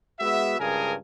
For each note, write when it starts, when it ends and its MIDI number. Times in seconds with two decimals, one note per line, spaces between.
0.20 0.56 56
0.20 0.56 59
0.20 0.56 66
0.20 0.56 76
0.60 0.96 37
0.60 0.96 43
0.60 0.96 68
0.60 0.96 70
0.60 0.96 80